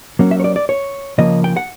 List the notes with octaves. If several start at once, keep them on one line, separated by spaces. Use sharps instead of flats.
F#3 A#3 C#4
E5
C#5
D5
D5
C#5
C#3 F3 A#3 D#5
G5
F#5